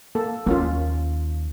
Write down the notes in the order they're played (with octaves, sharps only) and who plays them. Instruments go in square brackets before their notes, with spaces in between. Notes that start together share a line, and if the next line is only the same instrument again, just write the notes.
[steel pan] A#3 A4
[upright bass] D#2 [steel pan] A#3 C#4 F4